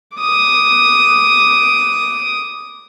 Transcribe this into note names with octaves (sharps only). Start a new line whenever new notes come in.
D6 D#6